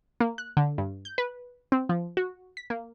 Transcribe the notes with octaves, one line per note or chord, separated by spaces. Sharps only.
A#3
F#6
D3
G2
G6
B4
C4
F3
F#4
B6
A#3